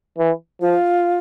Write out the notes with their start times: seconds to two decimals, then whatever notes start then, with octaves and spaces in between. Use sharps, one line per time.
0.18 E3
0.61 F3 F4